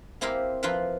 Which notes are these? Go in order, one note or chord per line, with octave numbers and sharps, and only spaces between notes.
A#3 C4 E4 G4 A#4 F5
F3 E4 F4 A#4 B4